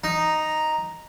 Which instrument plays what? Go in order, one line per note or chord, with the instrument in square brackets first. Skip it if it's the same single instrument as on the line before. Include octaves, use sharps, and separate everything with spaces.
[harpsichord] D#4 [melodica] A#5